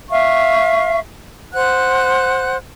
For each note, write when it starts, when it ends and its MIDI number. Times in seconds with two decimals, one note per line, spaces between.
0.10 0.98 76
0.10 0.98 77
0.10 0.98 85
1.53 2.56 72
1.53 2.56 78
1.53 2.56 90